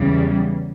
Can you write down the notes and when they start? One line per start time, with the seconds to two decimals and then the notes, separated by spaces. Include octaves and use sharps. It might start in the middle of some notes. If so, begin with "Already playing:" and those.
Already playing: E2 C#3 E3 G3